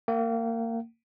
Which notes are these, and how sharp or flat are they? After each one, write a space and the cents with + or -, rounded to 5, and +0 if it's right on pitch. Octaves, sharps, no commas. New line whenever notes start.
A#3 -25 F#5 +45